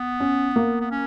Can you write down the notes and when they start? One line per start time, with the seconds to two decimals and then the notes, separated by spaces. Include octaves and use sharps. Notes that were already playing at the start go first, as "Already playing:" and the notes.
Already playing: B3
0.20 C#4
0.56 A#3
0.80 B3
0.91 C#4